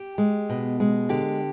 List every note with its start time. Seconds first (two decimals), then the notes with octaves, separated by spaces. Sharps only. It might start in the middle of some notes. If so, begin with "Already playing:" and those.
Already playing: G4
0.18 G#3
0.50 B2
0.80 G#3
1.09 D3 G4